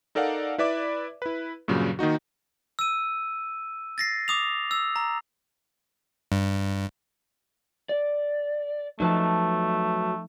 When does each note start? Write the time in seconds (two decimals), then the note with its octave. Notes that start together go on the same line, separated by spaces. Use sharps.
0.15 D#4 A4 A#4 D5 F5 F#5
0.58 E4 B4 D5 E5 D6
1.22 E4 B4
1.68 G2 A#2 C#3 F#3
1.99 D#3 A#3 D#4 F#4
2.79 E6 D#7
3.98 A6 A#6 C7
4.28 D6 D#6 F7
4.71 E6
4.96 A#5
6.32 G2
7.89 D5
9.00 F3 F#3 A3 D#4 B4 A5